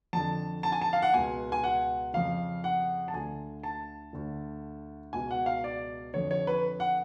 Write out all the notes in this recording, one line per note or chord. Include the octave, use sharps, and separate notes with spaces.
F2 D3 A5
A5
G#5
A5
F5
F#5
C#2 B2 G#5
G#5
F#5
F2 C#3 F5
F#5
A5
D2 D3 G#5
A5
D2 D3
C#2 B2 G#5
F#5
F5
D5
F2 D3 C#5
C#5
B4
F#5